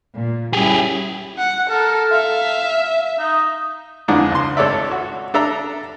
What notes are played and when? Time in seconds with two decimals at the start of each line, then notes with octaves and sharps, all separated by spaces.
0.13 A#2
0.53 G3 C#4 E4 G4 G#4
1.38 F#5
1.70 A4 A#4
2.12 E5 F5
3.19 D#4
4.08 F2 D3 E3 G#3 D4 D#4
4.32 C#2 C6
4.57 G#1 A4 C#5 D5 E5
4.91 F#4
5.34 D4 A4 E5 A#5